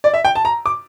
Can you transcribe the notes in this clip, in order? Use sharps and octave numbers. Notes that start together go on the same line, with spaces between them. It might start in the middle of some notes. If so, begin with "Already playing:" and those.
D5
E5
G5
A5
A#5
D6